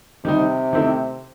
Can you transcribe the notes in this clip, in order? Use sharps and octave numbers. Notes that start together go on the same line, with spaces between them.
C3 D#3 G3 D#4
D#3 A3 C4 E4